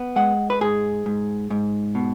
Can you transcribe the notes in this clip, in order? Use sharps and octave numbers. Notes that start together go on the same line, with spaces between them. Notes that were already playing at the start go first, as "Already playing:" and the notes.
Already playing: B3
G#3 F#5
B4
G#2 G#4
G#2
G#2
B2